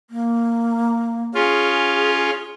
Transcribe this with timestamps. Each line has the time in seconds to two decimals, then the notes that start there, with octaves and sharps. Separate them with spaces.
0.10 A#3
1.34 C#4 F4 G#4